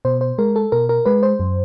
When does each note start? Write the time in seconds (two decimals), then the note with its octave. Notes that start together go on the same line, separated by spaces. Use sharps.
0.05 B2 C5
0.21 C5
0.38 G#3 A#4
0.56 A4
0.72 B2 A#4
0.89 A#4
1.05 G#3 B4
1.23 C5
1.40 F#2